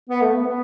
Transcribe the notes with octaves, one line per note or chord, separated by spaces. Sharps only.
B3
A3
B3
B3